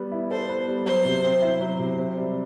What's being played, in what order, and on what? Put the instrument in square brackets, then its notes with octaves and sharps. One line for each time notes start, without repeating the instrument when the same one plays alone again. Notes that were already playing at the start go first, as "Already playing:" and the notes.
Already playing: [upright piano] G3 B3
E4
[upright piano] A4 [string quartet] C5
[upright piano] B3
G3
[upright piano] F#3 [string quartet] C5
[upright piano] C3
C4
E4
F#3
C3
C4
G3